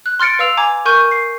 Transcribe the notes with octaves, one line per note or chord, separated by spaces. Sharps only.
F#6
C6 F6 A6 C#7 D7
B4 F5 E6 F7
G#5 A#5 D6 G#6
A#4 C#6 G6 D#7
C7